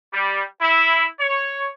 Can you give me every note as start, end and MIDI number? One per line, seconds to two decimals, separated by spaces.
0.14 0.42 55
0.61 1.04 64
1.20 1.71 73